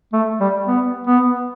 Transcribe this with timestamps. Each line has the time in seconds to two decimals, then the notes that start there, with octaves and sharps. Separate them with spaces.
0.13 A3
0.41 G3
0.67 B3
1.07 B3